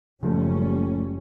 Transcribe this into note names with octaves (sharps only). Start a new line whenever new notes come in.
F#1 C#3 F3 G3 A3 C#4